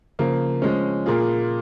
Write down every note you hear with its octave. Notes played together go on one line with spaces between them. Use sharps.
C#3 F3 A#3
F3 G#3 C#4
A#2 A#3 F4 G#4